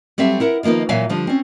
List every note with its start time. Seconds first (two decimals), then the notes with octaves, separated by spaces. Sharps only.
0.18 F#3 G3 C4 A4 E5
0.40 E4 A#4 F#5
0.63 D#3 F3 A#3 B3 D#4
0.89 A#2 E3 F#3 E5 F5 G#5
1.09 D3 F3 G3
1.27 C4 C#4